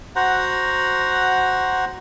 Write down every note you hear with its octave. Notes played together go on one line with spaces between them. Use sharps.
F#4 C5 F#5 A#5